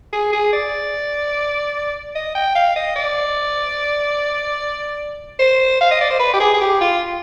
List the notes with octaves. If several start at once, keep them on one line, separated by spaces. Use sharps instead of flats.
G#4
G#4
D5
D#5
G5
F5
D#5
D5
C5
F5
D#5
D5
C5
B4
G4
G#4
G#4
G4
F4